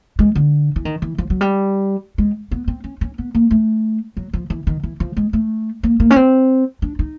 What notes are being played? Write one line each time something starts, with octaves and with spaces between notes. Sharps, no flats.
G#3
D3
E3
D#3
E3
F3
F#3
G3
G#3
B3
C4
C#4
C#4
B3
A#3
A3
F#3
F3
E3
D#3
E3
F3
G#3
A3
A#3
A#3
C#4
C4
D4
D#4